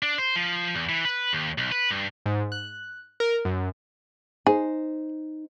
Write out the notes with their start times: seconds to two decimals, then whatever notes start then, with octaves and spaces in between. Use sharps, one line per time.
0.03 D4
0.18 C5
0.36 F3
0.75 E2
0.89 E3
1.05 B4
1.33 D#2
1.58 B1
1.72 B4
1.91 G2
2.26 G#2
2.52 F#6
3.20 A#4
3.45 F#2
4.47 D#4 G#4 C5